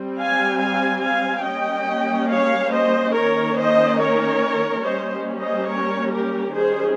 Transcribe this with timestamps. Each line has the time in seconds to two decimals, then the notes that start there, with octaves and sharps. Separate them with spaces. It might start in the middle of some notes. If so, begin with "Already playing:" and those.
Already playing: G3 C4
0.18 F5 G#5
0.59 F5 G#5
1.02 F5 G#5
1.44 G3 A#3 C#4 D#5 G5
2.29 C#5 F5
2.73 C5 D#5
3.14 D#3 A#3 C#4 A#4 C#5
3.57 C5 D#5
3.99 A#4 C#5
4.84 G3 A#3 C#4 C5 D#5
5.40 C5 D#5
5.69 A#4 C#5
6.12 G4 A#4
6.54 D#3 G3 C#4 G#4 C5